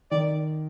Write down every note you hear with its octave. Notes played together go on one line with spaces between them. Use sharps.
D#3 D5